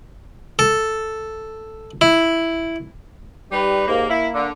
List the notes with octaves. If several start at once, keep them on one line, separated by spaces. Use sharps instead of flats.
A4
E4
G3 D#4 G4 B4
D#2 G#2 A#3
A#3 E4
D3